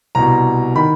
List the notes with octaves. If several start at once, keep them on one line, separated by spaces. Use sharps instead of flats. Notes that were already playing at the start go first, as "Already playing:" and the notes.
C2 B2 A#5
D#3 B5